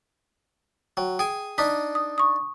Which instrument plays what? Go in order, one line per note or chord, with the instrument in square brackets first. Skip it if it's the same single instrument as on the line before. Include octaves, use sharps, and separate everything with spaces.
[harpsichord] F#3 [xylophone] G5
[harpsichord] G#4 G#5 [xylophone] G5
[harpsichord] D4 D#4 [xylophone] B6
[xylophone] D#6
C#6 D#6